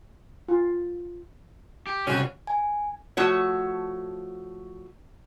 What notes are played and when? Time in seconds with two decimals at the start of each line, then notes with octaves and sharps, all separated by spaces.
0.48 F4
1.87 G4
2.08 C2 C#3 C4 C#4 F#4
2.47 G#5
3.17 F3 A3 F#4 C#5